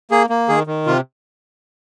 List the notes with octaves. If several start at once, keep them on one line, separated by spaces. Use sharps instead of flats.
A#3 G#4
A#3
D#3 G#4
D#3
C3 F4